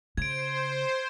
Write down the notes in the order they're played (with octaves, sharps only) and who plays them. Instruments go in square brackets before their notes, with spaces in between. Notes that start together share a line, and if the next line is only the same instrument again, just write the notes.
[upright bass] C#3 [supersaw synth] C5 [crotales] G#6 D7